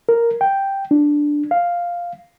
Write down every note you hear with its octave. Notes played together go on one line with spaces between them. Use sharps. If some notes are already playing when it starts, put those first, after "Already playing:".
A#4
G5
D4
F5